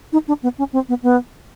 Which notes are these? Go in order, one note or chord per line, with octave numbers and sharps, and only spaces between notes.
D#4
D4
B3
C#4
C4
B3
B3